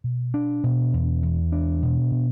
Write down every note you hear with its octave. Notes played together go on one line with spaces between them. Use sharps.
B2
D4
B2
E2
E2
D4
B2
B2